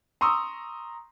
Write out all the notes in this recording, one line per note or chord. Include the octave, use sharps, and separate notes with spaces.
A#5 C6 C#6 D#6 E6